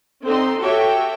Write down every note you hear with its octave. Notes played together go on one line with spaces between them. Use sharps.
D3 C4 D#4 C6
F#4 G4 A4 C#5 E5 G5